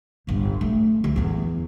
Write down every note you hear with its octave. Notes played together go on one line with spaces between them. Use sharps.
G1 C2
A3
D2
E2 E4